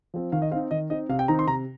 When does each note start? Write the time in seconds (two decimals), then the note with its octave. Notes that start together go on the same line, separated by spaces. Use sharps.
0.14 F3 C4
0.32 D#3 F5
0.42 D#5
0.51 C4 F5
0.56 D#4
0.71 D#3 D#5
0.90 C4 D#4 D#5
1.09 C3 F5
1.19 G5
1.28 D#3 C4 D#4 A#5
1.39 C6
1.47 C3 A#5